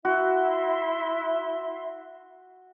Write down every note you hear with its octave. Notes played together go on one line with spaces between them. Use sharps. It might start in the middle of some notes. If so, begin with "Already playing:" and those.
E4 F#4 E5 C6